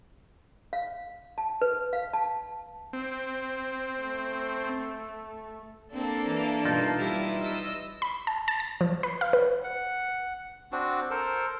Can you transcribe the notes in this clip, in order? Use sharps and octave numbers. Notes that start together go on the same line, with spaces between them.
F5
A5
B4
F5
A5
C4
A3
A#3 C4 D4 A4
E3
G2 B2 E3 D#4 F4
G3 E4 B4
D#5 E6
B5
A5
A5
A6
F3
B4
F5
B4
F#5
C4 D4 F#4
A4 A#4 C5